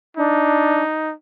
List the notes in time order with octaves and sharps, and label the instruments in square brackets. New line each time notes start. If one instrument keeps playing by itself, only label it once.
[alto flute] D4 [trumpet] D#4